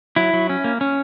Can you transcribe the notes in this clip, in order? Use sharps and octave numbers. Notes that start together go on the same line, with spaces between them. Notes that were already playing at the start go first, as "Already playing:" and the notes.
F#3 E4
F#3
C#4
A#3
C#4